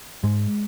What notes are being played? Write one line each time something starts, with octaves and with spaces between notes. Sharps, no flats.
G#2 G#3